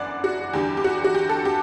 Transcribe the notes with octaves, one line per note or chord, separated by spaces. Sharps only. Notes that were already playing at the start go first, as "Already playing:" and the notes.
Already playing: G1 F#2 E3 D5 F#5
F#4
E2 D3 G3 G4
G4
F#4
F#4
G4
A4
G4